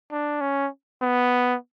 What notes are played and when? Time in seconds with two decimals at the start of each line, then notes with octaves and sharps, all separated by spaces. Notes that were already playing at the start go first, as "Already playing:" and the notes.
0.12 D4
0.41 C#4
1.02 B3